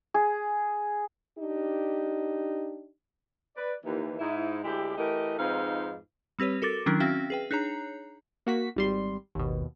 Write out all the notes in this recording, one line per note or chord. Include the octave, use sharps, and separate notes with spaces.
G#4
D4 D#4 G4
B4 D5
D#2 E3
G#2 D#4 E4
D2 G#3 E4 G4
E3 A3 E4 G4 A#4 D#5
F2 G#2 D#4 F4 B4 F5
G3 C4 G4 B4 C#5
F#4 A4 A#4 D6 A6
D#3 F#3 C#4 D4 E4 A#4
C4 C#4 F#4 E5 F5 G5
G#4 B4 G5
D4 D#4 G#4 C#5 A#5
A#3 F#4 B6
G#1 G3 C6
G#1 D#2 B2